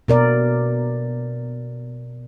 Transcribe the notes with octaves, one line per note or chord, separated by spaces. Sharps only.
B2 A#4 D5